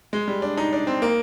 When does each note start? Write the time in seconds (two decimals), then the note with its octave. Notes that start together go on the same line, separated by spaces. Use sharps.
0.13 G#3
0.28 G3
0.42 D4
0.57 D#4
0.73 D4
0.87 C4
1.02 A#3